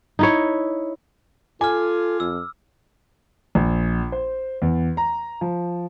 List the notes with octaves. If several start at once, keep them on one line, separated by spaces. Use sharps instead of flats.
D#4 E4 C#5
F4 A4 G#5 D6 F6
F2 E6
A#1
C5
E2
A#5
F3